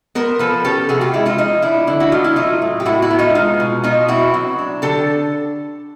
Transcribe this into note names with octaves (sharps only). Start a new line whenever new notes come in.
B3 A#4 C5
F3 A4 B4
C#4 G4 A4
C3 F#4 G#4
F4 G4
G#3 E4
D#4 F4
F3 D#4
D4 E4
D3 E4
E4 F#4
A3 D#4 F4
E4
F#3 D#4 F4
A2
G4
A2 E4 F#4
E4 F#4
B3
D#4 F4
G#3 D#4 F4
B2
B2 D#4 F4
C4 E4 F#4
F#3
D4
D3 G4 A4